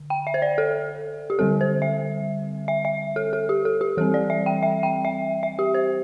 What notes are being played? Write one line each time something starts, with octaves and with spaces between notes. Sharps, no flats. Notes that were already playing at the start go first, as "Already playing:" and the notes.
Already playing: D3
G5
E5
C5
D5
A4
G4
D3 G3 C4 A4
C5
E5
E5
E5
A4
A4
G4
A4
G4
E3 G3 C4 A4
D5
E5
G5
E5
G5
E5
E5
G4
C5